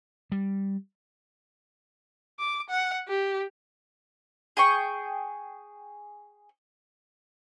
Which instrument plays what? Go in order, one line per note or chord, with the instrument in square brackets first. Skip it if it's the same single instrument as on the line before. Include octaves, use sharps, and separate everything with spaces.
[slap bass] G3
[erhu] D6
F#5
G4
[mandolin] G#4 G5 C#6